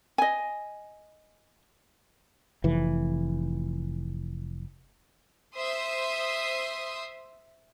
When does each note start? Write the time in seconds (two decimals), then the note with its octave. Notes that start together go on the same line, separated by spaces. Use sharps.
0.18 D#5 G#5
2.64 F1 E3
5.56 C5 E5 C6 D#6